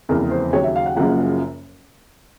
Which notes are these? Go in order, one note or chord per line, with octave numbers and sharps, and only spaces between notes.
F1 E2 C#3 E3 A#4
C5
D#2 C#3 F#3 C#5
E5
F5
F#5
F#1 F#2 C#3 F3 A#3 F#5